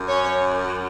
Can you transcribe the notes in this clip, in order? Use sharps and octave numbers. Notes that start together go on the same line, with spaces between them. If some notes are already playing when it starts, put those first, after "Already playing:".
Already playing: F#2
C#4 C#5